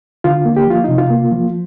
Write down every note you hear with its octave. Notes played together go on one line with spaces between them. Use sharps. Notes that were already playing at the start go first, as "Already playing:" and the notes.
D3 F4
A#3
G4
F3 F4
C3 D#4
F4
A#3
F3